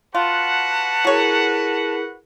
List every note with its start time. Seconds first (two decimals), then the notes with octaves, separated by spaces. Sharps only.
0.15 F4 F#4 B4 F#5 A5
1.05 F#3 E4 G#4 A#4 C#5